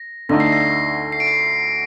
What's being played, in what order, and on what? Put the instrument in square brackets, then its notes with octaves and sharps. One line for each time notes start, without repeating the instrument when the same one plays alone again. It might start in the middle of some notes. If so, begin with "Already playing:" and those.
Already playing: [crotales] A#6
[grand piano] D2 D3 A3 D#4 [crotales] A#6
[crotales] C7
A#6
C7
D7
C7